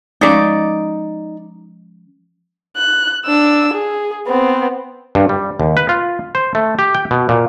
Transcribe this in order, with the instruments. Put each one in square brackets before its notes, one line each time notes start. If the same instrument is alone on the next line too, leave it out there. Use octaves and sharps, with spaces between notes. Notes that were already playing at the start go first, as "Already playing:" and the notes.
[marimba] F3 G#3 C#4 [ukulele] D#4 D5
[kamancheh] F#6
D4 E6
G#4
B3 C4
[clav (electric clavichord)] G2
G3
D#2
B4
F4
C5
A3
G4
G5
B2
A#2